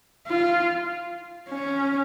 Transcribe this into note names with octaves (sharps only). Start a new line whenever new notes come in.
F4
C#4